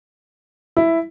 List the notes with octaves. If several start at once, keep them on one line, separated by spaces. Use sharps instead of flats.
E4